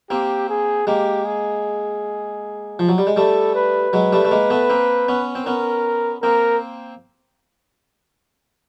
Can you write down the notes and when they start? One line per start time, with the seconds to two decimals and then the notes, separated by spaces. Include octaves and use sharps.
0.10 A#3 C4 G4
0.49 G#4
0.87 G#3 A#3 G4
1.25 G#4
2.79 F3
2.89 F#3
2.98 G3
3.07 G#3
3.17 G3 A3 A4
3.55 B4
3.93 F#3 G#3
4.13 G3 A3
4.25 A3
4.31 G#3 A#3
4.50 A3 B3
4.70 A#3 C4
5.08 B3 C#4
5.35 C4
5.46 B3 C#4 A#4
6.23 A#3 C4 A#4